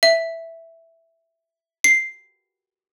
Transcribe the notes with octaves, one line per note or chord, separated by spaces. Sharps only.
E5
C7